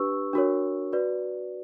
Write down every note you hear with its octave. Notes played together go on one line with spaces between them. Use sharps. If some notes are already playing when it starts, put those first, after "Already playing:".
Already playing: D4 G4 B4 C#6 E6
D4 F#4 A#4 C#5
F#4 B4 D5